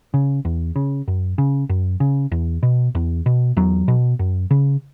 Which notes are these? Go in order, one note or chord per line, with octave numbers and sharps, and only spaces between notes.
C#3
E2
C#3
F#2
C#3
F#2
C#3
E2
B2
E2
B2
E2 F#3
B2
F#2
C#3